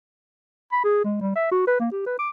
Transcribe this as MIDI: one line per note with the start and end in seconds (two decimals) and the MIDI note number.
0.72 0.84 83
0.84 1.00 68
1.04 1.16 56
1.21 1.33 55
1.36 1.50 76
1.51 1.66 66
1.67 1.79 71
1.80 1.88 58
1.92 2.03 67
2.06 2.14 71
2.19 2.29 86